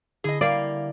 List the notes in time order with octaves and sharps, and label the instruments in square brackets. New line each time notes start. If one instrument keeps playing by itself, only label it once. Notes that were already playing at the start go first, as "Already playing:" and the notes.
[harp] D3 E4 [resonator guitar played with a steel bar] G#4 D#5
[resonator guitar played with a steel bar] G3 A#3 F5 [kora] D5